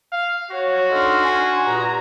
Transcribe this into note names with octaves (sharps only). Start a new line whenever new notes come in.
F5
F#4 C#5
D4 D#4 A4 C6 F6
G#5
G2 A#2 G#3 A#5